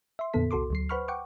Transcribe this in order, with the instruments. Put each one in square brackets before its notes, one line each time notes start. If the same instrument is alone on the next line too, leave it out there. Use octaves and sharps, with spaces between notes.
[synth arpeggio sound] E5 C6
F2 A#2 D3 B3 A4 B6
C2 F#4 A4 C6 D6
D2 F#3 C7
B4 C5 F#5 B5 C#6 F6
F#5 G5 C#6 D6